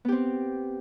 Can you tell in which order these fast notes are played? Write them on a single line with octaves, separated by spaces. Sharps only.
B3 G4 C4